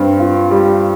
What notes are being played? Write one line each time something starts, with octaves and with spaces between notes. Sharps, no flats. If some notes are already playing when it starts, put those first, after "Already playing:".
Already playing: G2 C4
F4
G3